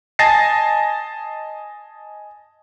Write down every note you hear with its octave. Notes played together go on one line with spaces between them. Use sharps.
D#5 G#5 A5 A6 A#6 C7